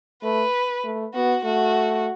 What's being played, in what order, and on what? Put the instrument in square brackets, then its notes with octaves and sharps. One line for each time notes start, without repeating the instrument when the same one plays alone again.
[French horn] A3 [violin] B4
[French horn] A3
[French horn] B3 [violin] F#4
[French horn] A3 [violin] F#4